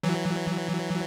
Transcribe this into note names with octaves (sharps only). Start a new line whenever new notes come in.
E3 F#3